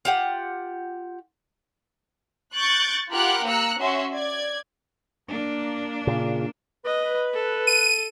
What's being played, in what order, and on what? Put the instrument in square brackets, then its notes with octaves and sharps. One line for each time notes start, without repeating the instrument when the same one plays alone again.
[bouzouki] F4 G4 F#5
[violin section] C#6 F#6 G6 A6 D7
F4 G4 A#4 F#5 B5 F#6
A#3 A#5 E6 F#6 C#7
C#4 F#4 E5 C6
D5 G#6
[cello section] A#3 D4
[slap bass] A#2 C#3
[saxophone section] B4 [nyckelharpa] D#5
[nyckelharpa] A4
[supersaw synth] D#7